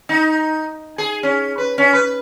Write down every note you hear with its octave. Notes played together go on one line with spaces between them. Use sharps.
D#4
G#4
C#4
B4
C#4
B4